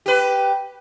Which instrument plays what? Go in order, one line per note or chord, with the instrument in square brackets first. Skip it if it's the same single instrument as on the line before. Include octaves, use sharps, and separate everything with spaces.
[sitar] G4 B4